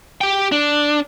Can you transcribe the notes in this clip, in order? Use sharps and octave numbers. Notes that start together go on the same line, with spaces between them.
G4 G5
D4